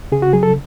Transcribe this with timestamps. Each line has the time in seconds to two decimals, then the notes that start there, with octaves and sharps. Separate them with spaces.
0.12 C#3 G#4
0.22 F#4
0.33 F#3 G#4
0.43 A4